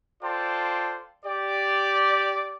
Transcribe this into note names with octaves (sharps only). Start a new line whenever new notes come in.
F4 A4 C5 D5 G5 A5
G4 D5